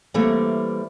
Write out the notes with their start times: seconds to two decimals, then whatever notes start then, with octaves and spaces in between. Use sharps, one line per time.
0.14 E3 G3 A3 A#3 C4